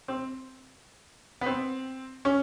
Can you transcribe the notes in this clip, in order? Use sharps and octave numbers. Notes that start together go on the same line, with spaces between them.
C4
B3
C4
C#4